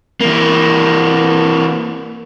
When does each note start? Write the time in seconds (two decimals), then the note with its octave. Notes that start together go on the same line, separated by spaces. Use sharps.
0.21 E3 A#3